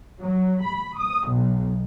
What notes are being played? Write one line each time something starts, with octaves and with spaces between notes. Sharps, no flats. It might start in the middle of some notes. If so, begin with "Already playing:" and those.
F#3
B5
D#6
B1